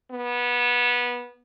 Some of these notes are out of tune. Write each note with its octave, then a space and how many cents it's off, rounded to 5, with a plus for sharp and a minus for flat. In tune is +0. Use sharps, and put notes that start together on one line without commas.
B3 -20